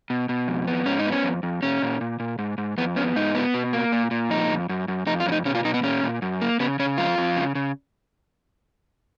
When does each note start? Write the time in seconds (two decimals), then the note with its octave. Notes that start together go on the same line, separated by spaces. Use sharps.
0.10 B2
0.29 B2
0.48 F2
0.67 B3
0.86 G#2 C#4
0.99 D#4
1.06 B3
1.12 C#4
1.24 F2
1.43 F2
1.63 A#2 C#4
1.82 A#2
2.01 A#2
2.20 A#2
2.39 G#2
2.58 G#2
2.78 F2 B3
2.96 B3 C#4
3.16 G#2 D#4
3.35 B3
3.54 B2
3.73 A#3
3.92 A#2
4.11 A#2
4.30 F2 D#4
4.50 F2
4.69 F#2
4.88 F#2
5.06 F2 D#4
5.20 F4
5.26 F2 C#4
5.32 D#4
5.45 B2 C#4
5.55 F4
5.65 B2 D#4
5.74 B3
5.83 A#2 C#4
6.03 A#2
6.22 F#2
6.41 A#3
6.60 C#3 B3
6.79 C#3 C#4
6.98 F2 F4
7.18 F2
7.37 C#3
7.55 C#3